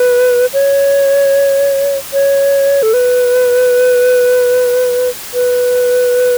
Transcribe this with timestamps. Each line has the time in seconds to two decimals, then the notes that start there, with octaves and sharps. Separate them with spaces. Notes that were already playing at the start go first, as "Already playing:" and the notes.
Already playing: B4
0.54 C#5
2.13 C#5
2.83 A4
2.94 B4
5.34 B4